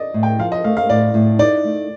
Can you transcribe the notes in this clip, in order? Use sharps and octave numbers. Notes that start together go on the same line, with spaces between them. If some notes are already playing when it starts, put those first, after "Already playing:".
Already playing: D5 D#5
A2
G5
F3 F5
D#5
A3 F5
F5
A2 D5
A2
D#4 D5
A3